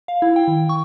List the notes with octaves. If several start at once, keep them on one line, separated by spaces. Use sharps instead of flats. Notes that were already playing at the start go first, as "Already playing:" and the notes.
F5
E4
G5
D#3
C#6